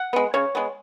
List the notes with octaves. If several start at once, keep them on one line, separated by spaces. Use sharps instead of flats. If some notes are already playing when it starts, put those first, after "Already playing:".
Already playing: F#5
G#3 B3
C#3 C#5
G#3 B3